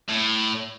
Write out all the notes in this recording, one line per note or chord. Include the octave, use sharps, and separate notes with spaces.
A2